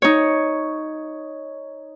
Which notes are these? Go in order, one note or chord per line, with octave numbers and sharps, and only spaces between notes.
D#4 C#5